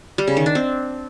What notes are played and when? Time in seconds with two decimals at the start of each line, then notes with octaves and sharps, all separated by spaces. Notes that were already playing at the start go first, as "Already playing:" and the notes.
0.18 G3
0.27 C#3
0.37 D#3
0.46 D4
0.55 C4